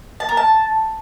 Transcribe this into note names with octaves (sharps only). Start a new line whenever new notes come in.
A5
A#4
A5